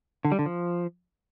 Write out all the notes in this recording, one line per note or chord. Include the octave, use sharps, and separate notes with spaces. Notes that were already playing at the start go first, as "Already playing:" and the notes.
D3
G3
D3
F3